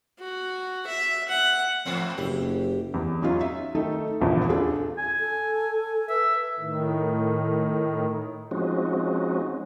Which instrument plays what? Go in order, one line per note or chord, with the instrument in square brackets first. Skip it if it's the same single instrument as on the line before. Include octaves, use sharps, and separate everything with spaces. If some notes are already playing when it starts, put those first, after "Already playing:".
[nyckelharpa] F#4
E5
F#5
[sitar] G#2 A3 C4 [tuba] F3
[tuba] F#1 [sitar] G4
[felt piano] E2
F#3 C#4 D#4 F4
E5
D#3 A3 D#4 A4
D#1 A#1 E2 A#2 C#3
D4 F4 G#4 A4
[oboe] G#5
[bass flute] A4
[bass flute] B4 [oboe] E5
[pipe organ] A2 D#3
[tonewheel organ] F3 G#3 C4 C#4 D#4 F#4